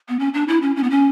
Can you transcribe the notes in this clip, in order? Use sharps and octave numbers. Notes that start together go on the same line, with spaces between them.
B3
C#4
D4
E4
C#4
C#4
B3
C#4